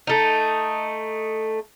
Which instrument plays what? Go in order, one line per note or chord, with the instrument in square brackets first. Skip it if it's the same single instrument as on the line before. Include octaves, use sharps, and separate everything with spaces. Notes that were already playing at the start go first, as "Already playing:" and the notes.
[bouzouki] A3 D#4